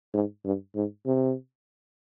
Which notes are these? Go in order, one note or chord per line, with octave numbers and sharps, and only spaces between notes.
G#2
G2
G#2
C3